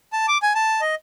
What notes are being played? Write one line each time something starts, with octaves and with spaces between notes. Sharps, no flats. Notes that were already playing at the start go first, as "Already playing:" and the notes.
A5
D6
G#5
A5
D#5